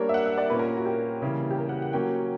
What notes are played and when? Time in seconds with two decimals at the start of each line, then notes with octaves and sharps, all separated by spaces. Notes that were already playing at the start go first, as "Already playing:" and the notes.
Already playing: G3 A#3 D4 A#4 C#5
0.09 E5
0.14 F#5
0.26 E5
0.38 D5
0.50 A#2 A#3 C#4 B4
0.59 A#4
0.77 F#4
0.85 G4
1.22 C#3 E3 G3 A#3 E4
1.51 G4
1.58 A#4
1.69 F#5
1.82 F#5
1.93 F#3 A#3 C#4 G5